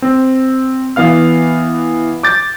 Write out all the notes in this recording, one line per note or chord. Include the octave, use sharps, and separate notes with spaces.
C4
E3 B3 F5 F6
D6 G6 A6